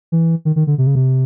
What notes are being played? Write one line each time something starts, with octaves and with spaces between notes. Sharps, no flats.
E3
D#3
D#3
D3
C3
C#3
C3